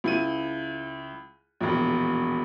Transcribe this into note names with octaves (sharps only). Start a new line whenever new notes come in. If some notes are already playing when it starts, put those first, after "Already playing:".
C#2 E4 D#7
E1 A#1